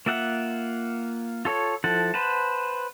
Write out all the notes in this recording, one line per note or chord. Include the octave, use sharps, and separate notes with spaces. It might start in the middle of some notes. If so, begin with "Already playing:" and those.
A#3 F4 E5 F#5
F4 A4 C#5
F3 E4 A4 F#5
B4 C5 F#5 A5